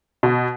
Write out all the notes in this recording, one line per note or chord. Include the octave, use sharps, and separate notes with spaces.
B2